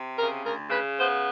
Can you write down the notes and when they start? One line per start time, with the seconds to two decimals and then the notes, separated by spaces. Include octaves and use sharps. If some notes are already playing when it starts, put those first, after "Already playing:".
Already playing: C3
0.18 C#3 A#4
0.44 D2 A#4
0.70 C#3 B4
0.97 B3 C5